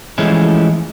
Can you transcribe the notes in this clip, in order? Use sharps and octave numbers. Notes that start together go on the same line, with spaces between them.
E3 F3 G#3 A3 C#4 E4